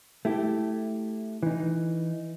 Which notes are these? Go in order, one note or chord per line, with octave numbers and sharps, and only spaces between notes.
A3 E4 G4
E3 D#4